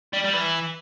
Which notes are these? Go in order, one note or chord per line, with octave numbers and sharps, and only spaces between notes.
G3
G3
E3